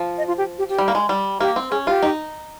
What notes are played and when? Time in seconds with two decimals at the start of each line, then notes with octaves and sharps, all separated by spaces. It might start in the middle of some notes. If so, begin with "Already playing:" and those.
Already playing: F3
0.18 D#5
0.28 F4
0.38 G4
0.58 G4
0.69 G4
0.78 G3
0.88 A#3
0.95 G#3
1.09 G3
1.40 A#3 G4
1.56 C4
1.71 C#4 G#4
1.86 F4 G4
2.03 D#4